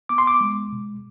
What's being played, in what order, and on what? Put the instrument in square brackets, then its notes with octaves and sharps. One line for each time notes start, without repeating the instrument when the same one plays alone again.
[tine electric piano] B3 D6
C6
D6
G#3
B2